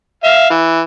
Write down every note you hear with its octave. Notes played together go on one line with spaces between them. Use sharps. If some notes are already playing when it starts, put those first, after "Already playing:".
E5 F5
E3